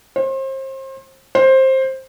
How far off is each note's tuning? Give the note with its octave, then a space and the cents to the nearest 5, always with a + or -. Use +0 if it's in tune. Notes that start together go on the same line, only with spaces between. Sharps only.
C5 +35
C5 +15